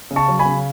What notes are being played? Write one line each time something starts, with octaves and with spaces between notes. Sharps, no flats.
C#3
A5 C#6
F#3
G#5 B5
C#3